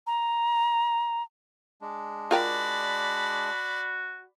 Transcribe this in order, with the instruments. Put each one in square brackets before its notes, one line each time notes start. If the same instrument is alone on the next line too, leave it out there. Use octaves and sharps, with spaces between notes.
[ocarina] A#5
[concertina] G#3 D4
[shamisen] F4 A#4 G5 [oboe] F#4 [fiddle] D5 B5